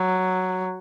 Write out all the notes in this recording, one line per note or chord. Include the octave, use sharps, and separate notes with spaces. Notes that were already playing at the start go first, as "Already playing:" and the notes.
Already playing: F#3